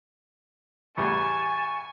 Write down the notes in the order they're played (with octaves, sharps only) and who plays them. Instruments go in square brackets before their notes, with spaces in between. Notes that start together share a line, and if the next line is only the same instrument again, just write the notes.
[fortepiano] A1 E2 G3 [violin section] G#5 [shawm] A5 [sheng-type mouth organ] C#6